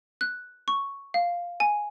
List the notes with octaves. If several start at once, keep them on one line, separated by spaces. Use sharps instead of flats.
F#6
C#6
F5
G#5